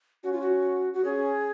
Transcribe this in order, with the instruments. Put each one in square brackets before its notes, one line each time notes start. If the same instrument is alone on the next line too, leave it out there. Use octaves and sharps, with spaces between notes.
[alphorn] C#4 [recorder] F#4
[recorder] F4
F#4
F#4
[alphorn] C#4 [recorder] G#4